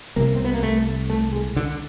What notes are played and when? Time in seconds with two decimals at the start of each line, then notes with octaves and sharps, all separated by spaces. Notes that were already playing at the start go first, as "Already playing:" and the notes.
0.16 C2 C3 A#3
0.35 C4
0.45 B3
0.54 A#3
0.63 A3
1.10 A3
1.32 G#3
1.56 D3